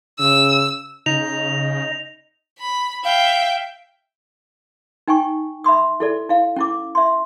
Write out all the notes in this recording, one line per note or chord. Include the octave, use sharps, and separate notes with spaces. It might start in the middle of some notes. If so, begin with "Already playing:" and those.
C#3 E6
C#3 D#4 D#5 F7
B5
E5 F5 G5
D#4 G5 G#5 C#6
E5 B5 C6 D#6
E4 A4 D5
E4 F5
C#4 E4 D6
E5 C6